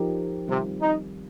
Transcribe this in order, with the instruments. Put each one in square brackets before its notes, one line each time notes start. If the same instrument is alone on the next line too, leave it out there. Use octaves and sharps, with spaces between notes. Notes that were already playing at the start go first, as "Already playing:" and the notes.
Already playing: [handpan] F3 D#4 G4 A#4
[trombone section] C3 [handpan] D#3 G3 C4 F4
[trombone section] D#4